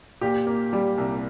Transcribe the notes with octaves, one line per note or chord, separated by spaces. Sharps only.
A#2 G4
A#3
G3
C2